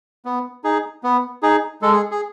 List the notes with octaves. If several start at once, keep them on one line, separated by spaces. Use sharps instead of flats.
B3
D#4 G#4
B3
D#4 G#4
G#3 A4
G#4
G#4